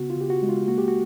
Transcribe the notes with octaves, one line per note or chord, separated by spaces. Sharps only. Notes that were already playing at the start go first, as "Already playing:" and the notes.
Already playing: C#3 B3 F#4
F4
C#3 G4
F#4
G#3
F4
A#3 F#4
G4
F#4